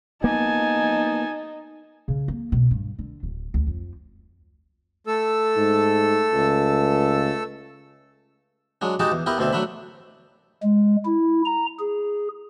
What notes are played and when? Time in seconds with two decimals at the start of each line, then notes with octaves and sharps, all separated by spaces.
0.24 A#3 B3 D#4 G#5 A5
2.08 C#3
2.28 A#3
2.52 B2
2.71 G2
2.99 D3
3.23 D1
3.54 D2
3.67 F2
5.07 A3 A4 E6
5.57 G#2
6.33 C#2
8.81 F#3 G#3 D4
8.99 G#3 D#4 F#4 G4 A5 D6
9.12 E2
9.26 B3 E4 G4 A#4 B4
9.38 D2 B2 C4 D5 E5
9.53 F#3 A3 D4 E5 B5
10.63 G#3
11.06 E4
11.46 A#5
11.79 G#4